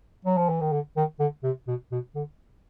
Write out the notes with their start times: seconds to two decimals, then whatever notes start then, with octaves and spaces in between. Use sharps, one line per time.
0.25 F#3
0.37 F3
0.49 E3
0.61 D#3
0.72 D3
0.97 D#3
1.20 D3
1.44 C3
1.67 B2
1.92 B2
2.15 D3